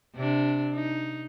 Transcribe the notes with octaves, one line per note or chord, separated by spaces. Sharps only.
C3 D4
D#4